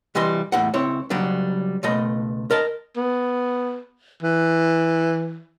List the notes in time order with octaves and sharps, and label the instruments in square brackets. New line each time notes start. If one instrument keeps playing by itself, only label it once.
[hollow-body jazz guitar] C3 E3 G3 D#5 C6
E2 A2 F#5
C#2 C4 E4 C#5
C#3 F#3 G3 D4
C#2 B2 A3 D#5
A#4 D#5 A5
[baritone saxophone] B3
E3